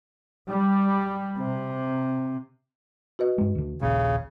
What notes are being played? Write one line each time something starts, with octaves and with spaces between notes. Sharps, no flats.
G3
C3
F#4 B4 D#5
G2 G#3
D2 D3
D#1 A#1 C#3